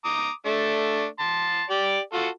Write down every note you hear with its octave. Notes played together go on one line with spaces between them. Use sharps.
A#5 D6 D#6
A3 D4
A5 C6
G4 D5
F4 F#4 A4